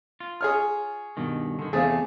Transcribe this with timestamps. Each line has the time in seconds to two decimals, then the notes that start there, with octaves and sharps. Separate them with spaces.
0.20 F4
0.41 G#4 C#5 F6
1.17 G2 B2 D#3
1.59 D3 D#3
1.73 E2 C3 A3 G#4 C5 F5